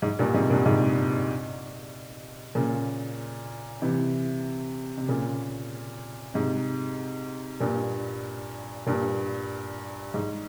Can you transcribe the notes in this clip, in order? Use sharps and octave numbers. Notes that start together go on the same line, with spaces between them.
G#2
G2 A#2
G#2 C3
G2 A#2
G#2 C3
A#2 C#3
C3 E3
C3
A#2 C#3
G#2 C3
G2 A#2
G2 A#2
G#2